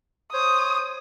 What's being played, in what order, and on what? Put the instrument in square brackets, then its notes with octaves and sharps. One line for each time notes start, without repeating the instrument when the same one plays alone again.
[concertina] C5 C#5 [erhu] D#6